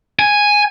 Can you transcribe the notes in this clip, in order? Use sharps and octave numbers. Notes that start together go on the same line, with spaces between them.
G#5